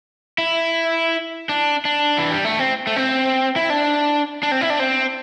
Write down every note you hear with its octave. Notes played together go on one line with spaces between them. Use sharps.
E4
D4
D4
E3
G3
A3
C4
A3
C4
E4
D4
D4
C4
E4
D4
C4